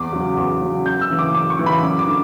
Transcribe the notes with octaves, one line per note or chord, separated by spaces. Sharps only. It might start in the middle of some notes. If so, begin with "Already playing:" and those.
Already playing: E2 D6
C#3 F#3
E2 D6
C#3 F#3
F#2 G6
E6
C#3 E3
D6
F#2 D6
C#6
C#3 E3
B5
F#2 D6
D6
D3